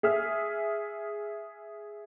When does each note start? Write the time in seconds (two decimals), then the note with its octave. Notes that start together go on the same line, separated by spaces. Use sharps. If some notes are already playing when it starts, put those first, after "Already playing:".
0.03 G#4 E5 F6